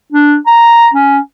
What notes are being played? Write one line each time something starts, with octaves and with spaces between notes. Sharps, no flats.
D4
A#5
C#4